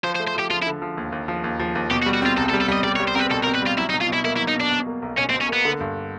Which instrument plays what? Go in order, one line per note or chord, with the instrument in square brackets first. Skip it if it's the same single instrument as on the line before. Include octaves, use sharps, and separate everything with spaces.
[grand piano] F3 [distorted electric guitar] C5
[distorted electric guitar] C5
[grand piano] A3
[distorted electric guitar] C5
[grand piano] F3 [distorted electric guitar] G4
[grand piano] F3 [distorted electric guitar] F4
[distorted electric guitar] E4
[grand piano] D3
F3
D#2
D#2
F3
D#2
F3
D#2
[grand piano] B2 [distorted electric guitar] G4
[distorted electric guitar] F#4
[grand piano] G3
[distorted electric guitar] F#4
[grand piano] C4 [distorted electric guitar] F4
[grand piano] C2 [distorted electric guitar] A4
[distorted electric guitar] A4
[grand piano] G3
[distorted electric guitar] A4
[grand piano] G3 [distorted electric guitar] D#5
[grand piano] G3 [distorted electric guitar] D5
[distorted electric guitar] C#5
[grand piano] G3
[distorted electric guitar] C5
[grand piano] C4 [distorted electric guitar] A#4 B4
[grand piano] B2 [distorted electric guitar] A4
[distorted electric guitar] A#4
[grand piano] C4
[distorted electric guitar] B4
[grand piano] G3 [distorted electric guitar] F4
[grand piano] F#3 [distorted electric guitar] E4
[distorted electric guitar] D#4
[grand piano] B2
[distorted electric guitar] F4
[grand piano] B2 [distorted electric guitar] E4
[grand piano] A#3 [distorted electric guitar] E4
[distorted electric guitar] E4
[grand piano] F#3
[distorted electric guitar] D#4
[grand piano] B2 [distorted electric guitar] D4
[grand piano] B2
A#3
B1
[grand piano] B2 [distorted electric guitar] C#4
[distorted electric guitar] C4
[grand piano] B2
[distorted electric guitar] C#4
[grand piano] A#3 [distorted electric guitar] B3
[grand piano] D3
G2